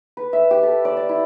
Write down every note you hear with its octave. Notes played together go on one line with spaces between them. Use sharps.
B4
E5
G4
A4
D5
D5
E4